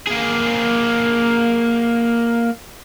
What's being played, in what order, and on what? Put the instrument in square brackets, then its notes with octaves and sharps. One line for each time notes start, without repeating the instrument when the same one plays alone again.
[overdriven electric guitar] A#3 G#4